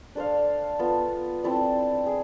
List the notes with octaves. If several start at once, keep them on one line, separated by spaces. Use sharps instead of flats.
D4 A4 C5 F5
B3 F4 A4
C4 E4 A4 D5
G#4